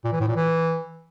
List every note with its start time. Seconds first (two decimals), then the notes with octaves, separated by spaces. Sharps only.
0.05 A#2
0.12 E3
0.20 A2
0.28 A#2
0.36 E3